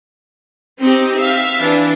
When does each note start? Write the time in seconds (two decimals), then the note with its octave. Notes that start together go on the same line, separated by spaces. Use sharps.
0.79 C4 D#4 G4
1.17 E5 F5
1.60 E3 D4